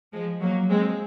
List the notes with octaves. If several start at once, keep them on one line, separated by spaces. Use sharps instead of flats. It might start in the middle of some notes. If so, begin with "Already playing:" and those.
F3 G#3
F#3 A#3
G#3 C4